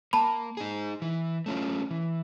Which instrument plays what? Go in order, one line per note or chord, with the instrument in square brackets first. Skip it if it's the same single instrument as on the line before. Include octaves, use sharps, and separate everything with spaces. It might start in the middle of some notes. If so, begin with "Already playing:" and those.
[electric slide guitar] A#3 [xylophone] A5 B5
[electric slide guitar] D#4 G#4
E3
A3 C#4 F4
E3